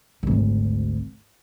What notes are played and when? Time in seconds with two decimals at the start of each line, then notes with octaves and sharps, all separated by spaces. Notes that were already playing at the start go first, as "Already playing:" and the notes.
0.23 G#1 D2